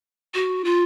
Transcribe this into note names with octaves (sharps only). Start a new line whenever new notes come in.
F#4
F4